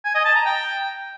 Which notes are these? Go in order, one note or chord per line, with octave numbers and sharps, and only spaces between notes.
G#5
D#5
A5
A#5
G5